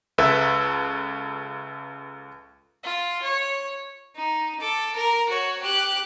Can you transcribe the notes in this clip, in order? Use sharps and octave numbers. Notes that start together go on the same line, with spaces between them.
C#2 A4 B4 E5
F4
C#5
D#4
A4 D6
A#4
F#4 C#5
G4 F#6